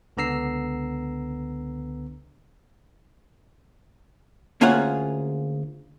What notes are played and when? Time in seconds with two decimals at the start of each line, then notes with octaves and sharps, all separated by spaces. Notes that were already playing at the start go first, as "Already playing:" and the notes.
0.17 C#2 D3 B3 A#5 E6 C7
4.61 D2 A#3 C#4 F4 G#4 F#5